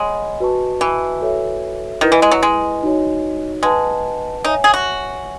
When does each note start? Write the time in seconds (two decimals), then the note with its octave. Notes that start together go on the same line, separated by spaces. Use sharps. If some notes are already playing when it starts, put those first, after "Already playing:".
Already playing: G#3 C#5 F#5 B5
0.40 F#4 B4 D#5 A5 C#6
0.81 E3
1.21 F#4 A4 C#5 E5
2.01 D#3 E4 B4 D#5
2.12 E3
2.22 G#3
2.31 F#3
2.43 G#3
2.83 D#4 F#4 C#5
3.63 G#3 B4 F#5 A5
4.44 D#4 C#5 E5 G#5
4.64 G#4
4.74 F#4